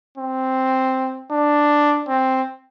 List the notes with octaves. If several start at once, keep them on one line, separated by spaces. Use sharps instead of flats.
C4
D4
C4